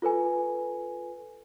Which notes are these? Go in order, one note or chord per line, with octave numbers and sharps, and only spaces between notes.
F4 A4 B4 G#5